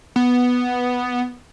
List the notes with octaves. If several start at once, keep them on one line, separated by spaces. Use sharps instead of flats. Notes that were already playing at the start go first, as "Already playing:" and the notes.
B3